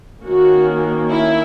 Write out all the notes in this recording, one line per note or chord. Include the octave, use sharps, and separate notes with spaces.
D#3 A#3 C#4 F#4
E4